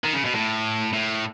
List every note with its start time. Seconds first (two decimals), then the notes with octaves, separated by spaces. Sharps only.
0.04 D#3
0.14 C#3
0.25 B2
0.35 A2
0.93 A2